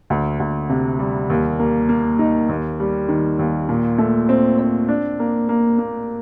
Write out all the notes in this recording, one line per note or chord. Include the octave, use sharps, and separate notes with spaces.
D2
D2
C3
G3
D#2
A#3
A#3
D#4
D#2
G3
D#3
D#2
A#2
A3
C4
C4
D4
A#3
A#3
A#3